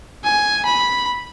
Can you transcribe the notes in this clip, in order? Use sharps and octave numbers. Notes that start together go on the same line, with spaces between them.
G#5
B5